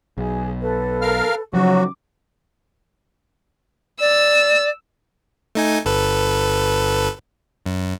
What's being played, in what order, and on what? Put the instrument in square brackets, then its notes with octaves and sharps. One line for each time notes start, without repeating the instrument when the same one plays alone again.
[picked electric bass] B1 [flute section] G#4
[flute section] A4 B4
[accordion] A#4 F5 F6
[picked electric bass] C#3 F3 [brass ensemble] F#3 [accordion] F#4 [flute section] D6
[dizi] D5 [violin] E6
[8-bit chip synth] A3 D#4 G#5
G1 A4 B4
F#2